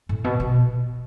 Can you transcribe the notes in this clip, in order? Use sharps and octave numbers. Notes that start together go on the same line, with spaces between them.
A2
B2
B2